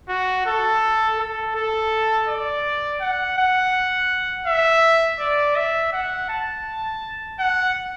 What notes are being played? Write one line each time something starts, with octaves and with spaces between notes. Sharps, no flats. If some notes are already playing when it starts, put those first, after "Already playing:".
F#4
A4
A4
A4
D5
F#5
F#5
E5
D5
E5
F#5
A5
F#5